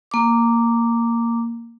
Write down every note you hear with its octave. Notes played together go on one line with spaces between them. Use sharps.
A#3 D6